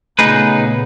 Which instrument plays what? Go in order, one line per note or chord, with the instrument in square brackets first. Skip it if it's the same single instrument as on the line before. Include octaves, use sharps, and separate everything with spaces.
[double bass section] A#2 C#3 B3 [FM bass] A3 [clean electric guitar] D#4 G#4 B4